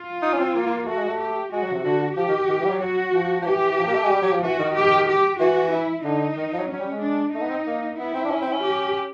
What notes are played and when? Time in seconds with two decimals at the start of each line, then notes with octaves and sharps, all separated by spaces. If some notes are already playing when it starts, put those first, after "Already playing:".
Already playing: F4
0.22 D#4
0.33 C#4
0.40 C4
0.55 A#3
0.67 A#3
0.77 A#3
0.87 A3 F#4
0.97 G#3
1.08 A3
1.20 G4
1.52 G#3 F#4
1.63 F#3
1.73 C3
1.84 D3 F#4
2.17 F3 G4
2.28 D#3
2.48 D#3
2.60 E3
2.65 G3
2.71 F#3
2.81 F#3 F#4
3.14 F3
3.42 F3
3.46 E3 G4
3.71 E3
3.78 F3
3.87 A#3
3.95 A3
4.03 G#3
4.10 G3
4.22 F#3
4.32 F3
4.43 E3 F#4
4.59 D#3
4.75 G4
5.07 G4
5.39 E3 F#4
5.72 E4
6.04 D3 D#4
6.36 D#3
6.53 F3
6.58 F#3
6.69 F#3 C#4
6.80 G3
6.91 G#3
7.01 D4
7.33 A3 D#4
7.42 B3
7.50 C4
7.67 A#3
7.99 B3 E4
8.14 C4
8.25 D4
8.31 C#4
8.42 C4
8.52 C#4
8.63 G4